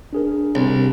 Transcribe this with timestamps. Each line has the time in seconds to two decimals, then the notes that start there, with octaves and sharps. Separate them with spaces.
0.13 D4 G#4 A#4
0.55 C2